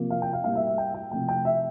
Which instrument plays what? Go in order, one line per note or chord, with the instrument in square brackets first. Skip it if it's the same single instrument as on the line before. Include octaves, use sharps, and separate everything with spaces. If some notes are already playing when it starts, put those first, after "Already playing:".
Already playing: [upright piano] C3 F3 A#3
F5
G5
F5
A2 G3 A#3 F5
E5
E5
G5
G5
C3 F3 A3 G5
G5
E5